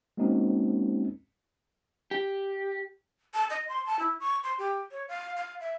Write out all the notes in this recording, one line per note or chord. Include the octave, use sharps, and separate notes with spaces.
G#3 A#3 C4 C#4 D#4 F#4
G4
A5
D#5
C6
A5
E4
C#6
C6
G4
C#5
F5
F5
E5